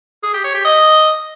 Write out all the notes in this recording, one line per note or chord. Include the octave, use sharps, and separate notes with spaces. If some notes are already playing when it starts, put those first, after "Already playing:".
G#4
G4
C#5
G4
D#5